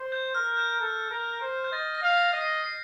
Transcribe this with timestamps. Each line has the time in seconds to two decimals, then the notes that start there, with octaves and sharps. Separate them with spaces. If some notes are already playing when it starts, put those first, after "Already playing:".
Already playing: C5
0.12 G6
0.35 A#4 F6
0.57 G6
0.80 A4
1.11 A#4
1.42 C5
1.64 G6
1.72 D#5 A6
1.95 A#6
2.02 F5
2.18 A#6
2.33 D#5
2.41 C7
2.64 C7